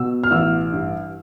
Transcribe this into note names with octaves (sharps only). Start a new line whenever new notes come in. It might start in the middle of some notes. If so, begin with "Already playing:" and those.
Already playing: B2 E6
F6
A1 E6
G2